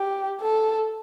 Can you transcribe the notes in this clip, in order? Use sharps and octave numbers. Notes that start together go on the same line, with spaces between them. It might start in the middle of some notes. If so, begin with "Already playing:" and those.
Already playing: G4
A4